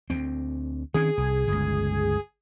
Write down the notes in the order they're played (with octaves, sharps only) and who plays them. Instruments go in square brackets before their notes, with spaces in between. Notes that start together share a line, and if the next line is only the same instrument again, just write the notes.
[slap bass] D2 C4
[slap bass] D#3 C4 C#4 [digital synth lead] G#4
[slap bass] C2
G1 C#2